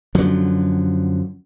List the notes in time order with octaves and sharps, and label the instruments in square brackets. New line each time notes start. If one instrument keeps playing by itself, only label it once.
[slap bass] F#2 D3 F3 F#3